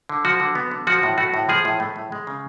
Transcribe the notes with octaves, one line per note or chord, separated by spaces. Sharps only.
D3
F3 F#4
D3
B3
D3
F3 F#4
A2
A3 F#4
A2
F3 G#4
A2
A3
A2
G#3
C#3